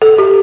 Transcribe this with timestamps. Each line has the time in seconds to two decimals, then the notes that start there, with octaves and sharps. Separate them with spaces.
0.02 A4
0.18 G4